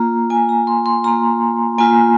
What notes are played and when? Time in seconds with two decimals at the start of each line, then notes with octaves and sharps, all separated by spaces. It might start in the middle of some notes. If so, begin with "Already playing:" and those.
Already playing: A#3 F4 A#5
0.30 A#3 F4 G#5
0.49 A#5
0.67 C6
0.86 C6
1.04 A#3 F4 A#5
1.78 A#3 F4 G#5